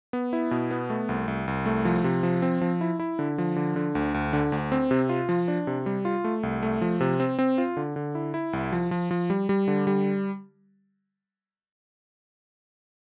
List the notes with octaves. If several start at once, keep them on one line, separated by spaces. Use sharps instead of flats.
B3
E4
B2
B3
A3
C2
C2
C2
A3
F3
C3
F3
C4
F3
E4
E4
D3
F3
D3
D3
D2
D2
D3
D2
C4
C3
F4
F3
D4
C3
G3
F4
A3
C2
A3
F3
C3
C4
C4
F4
D3
D3
E4
E4
C2
F3
F3
F3
G3
G3
D3
G3